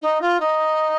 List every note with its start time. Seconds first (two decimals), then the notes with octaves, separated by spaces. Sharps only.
0.02 D#4
0.21 F4
0.40 D#4